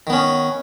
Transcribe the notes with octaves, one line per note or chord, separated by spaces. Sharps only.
D#3 B3 C#4